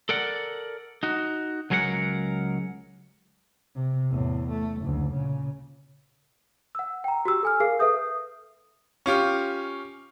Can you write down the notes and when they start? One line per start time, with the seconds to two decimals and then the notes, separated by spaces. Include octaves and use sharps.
0.09 A4 A#4 D5 F#5
1.03 D#4 F#4
1.70 C#2 F#3 G#4 A#4 D#5 F#5
3.75 C3
4.10 E2 A2
4.50 A3
4.81 F#1 D2
5.13 A#2 C#3
6.75 F#5 E6
7.04 G5 A#5
7.25 F#4 G4 E6
7.43 A4 G#5 F6
7.60 G#4 A#4 F5 C7
7.79 A4 B4 E5 D#6 G6
9.06 C#4 F4 G4